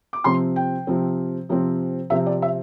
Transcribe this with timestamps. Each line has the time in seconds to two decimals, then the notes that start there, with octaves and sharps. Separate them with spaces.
0.13 D6
0.24 C3 F3 C4 C6
0.56 G5
0.87 C3 F3 C4
1.49 C3 F3 C4
2.10 C3 F3 C4 E5
2.26 D5
2.42 E5